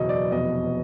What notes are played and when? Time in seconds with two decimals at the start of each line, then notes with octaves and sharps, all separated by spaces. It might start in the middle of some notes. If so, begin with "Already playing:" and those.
Already playing: F#1 E2 B2 F#3 D#5
0.09 D5
0.32 F1 E2 B2 D#5